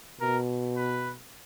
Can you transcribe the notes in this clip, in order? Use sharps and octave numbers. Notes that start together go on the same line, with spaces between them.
B2 A#4
B4